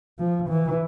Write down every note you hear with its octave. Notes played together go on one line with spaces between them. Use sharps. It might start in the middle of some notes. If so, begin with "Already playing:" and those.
F3
E3